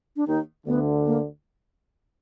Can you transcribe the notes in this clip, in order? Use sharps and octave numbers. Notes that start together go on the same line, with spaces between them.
D4
D#2 D#3 D#4
D2 D3 B3
A#3